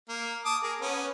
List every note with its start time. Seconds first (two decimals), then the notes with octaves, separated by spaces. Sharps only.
0.09 A#3
0.45 A5 D6 D#6
0.63 G#4 A#4
0.81 B3 C#4